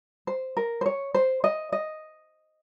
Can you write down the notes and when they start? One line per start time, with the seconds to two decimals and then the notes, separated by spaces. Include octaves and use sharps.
0.27 C5
0.57 A#4
0.81 C5
0.86 C#5
1.14 C5
1.44 D#5
1.72 D#5